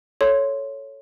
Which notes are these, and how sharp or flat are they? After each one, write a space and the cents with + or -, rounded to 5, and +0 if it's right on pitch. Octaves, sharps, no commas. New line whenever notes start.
A4 +0 C#5 +0 C6 +0